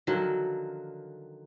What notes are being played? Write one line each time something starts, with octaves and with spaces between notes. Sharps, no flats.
D3 D#3 F3 F#3